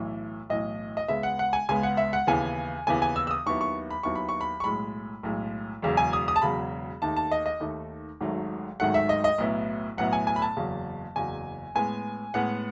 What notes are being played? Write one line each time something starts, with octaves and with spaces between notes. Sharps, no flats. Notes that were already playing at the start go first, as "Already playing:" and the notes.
Already playing: B1 A2 E3
B1 A2 E3 D#5
D#5
C#2 C#3 G#3 B3 E5
F#5
F#5
G#5
C#2 C#3 G#3 B3 G#5
F#5
E5
F#5
D#2 C#3 E3 B3 G#5
D#2 C#3 E3 B3 G#5
G#5
E6
E6
D#6
D#2 D#3 F#3 B3 E4 C#6
C#6
B5
D#2 D#3 F#3 B3 E4 C#6
B5
C#6
B5
C#6
B1 A2 G#3 B5
B1 A2 G#3
E1 E2 C#3 F#3
G#5
D#6
D#6
A5
E1 E2 C#3 F#3 B5
D#2 D#3 A3 D#4 A5
A5
D#5
D#5
D#2 D#3 A3 D#4
G#1 G#2 D#3 F#3 A3
G#1 G#2 D#3 F#3 A3 F#5
E5
D#5
D#5
B1 A2 F#3 B3 E4
B1 A2 F#3 B3 E4 F#5
G#5
G#5
B5
A5
F#1 E2 C#3 F#3
F#1 E2 C#3 F#3 G#5
A2 G#3 B3 G#5
A2 G#3 B3 F#5